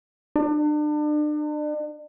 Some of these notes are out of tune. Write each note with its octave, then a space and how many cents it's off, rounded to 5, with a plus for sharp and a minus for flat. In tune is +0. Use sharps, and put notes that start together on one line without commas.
D4 +35